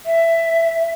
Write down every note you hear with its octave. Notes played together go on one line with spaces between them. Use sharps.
E5